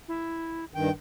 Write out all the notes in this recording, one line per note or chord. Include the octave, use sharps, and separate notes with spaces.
E4
G2 D#3 G5